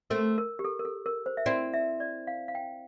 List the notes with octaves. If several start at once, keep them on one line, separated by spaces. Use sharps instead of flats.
A3 C4 A#4
A#4
G4
A4
A#4
A4
A#4
C5
E5
C4 E4 D5
E5
D5
F5
F5
G5